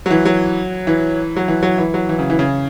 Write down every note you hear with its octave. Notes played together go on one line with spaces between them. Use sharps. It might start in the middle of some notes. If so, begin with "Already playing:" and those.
F#3
E3
F#3
E3
F#3
E3
F#3
E3
F#3
E3
C#3
E3
C#3